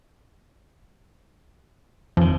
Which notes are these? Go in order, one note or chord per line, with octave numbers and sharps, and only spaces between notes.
F2 D#3 F3